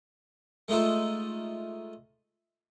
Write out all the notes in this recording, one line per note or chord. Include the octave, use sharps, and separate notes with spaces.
G#3 A3 D#4 F4 A4